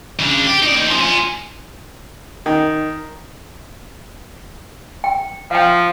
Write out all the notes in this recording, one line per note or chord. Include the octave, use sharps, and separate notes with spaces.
C#3 D4
G4
D#4 D5
A#3 D#4
F#2 F3
F4 G#5
D#3
G5
F3 F5 G5